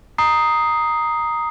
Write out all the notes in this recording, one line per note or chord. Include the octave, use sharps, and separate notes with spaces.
A#5 D#6 C7